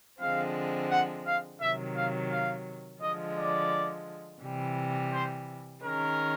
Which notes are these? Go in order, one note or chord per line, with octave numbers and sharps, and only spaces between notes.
D3 F3 G#3 C4 F5
F#5
F5
C3 D#3 F#3 E5
F5
F5
D3 F3 G#3 D#5
D5
C3 E3 G3
C5
D#3 G#3 C#4 A#4